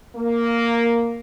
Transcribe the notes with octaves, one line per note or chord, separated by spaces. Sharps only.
A#3